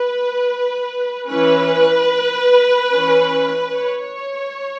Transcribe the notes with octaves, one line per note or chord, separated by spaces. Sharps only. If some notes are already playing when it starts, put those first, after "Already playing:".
Already playing: B4
E3 C#4 B4
E3 C#4
C#5